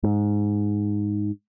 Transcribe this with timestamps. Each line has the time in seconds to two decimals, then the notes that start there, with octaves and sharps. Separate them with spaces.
0.03 G#2